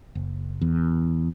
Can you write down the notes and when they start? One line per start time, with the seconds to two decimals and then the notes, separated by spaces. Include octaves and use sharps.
0.15 F#1
0.61 E2